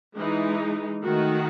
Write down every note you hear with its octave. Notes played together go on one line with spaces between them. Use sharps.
E3 G#3 D#4
D#3 A3 D#4 F#4